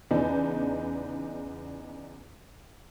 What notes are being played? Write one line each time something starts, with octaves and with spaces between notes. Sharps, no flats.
E2 C#3 B3 D4 D#4